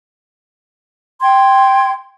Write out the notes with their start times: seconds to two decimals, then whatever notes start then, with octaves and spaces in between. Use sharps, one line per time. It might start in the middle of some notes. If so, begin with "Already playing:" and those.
1.21 G5 C6 G#6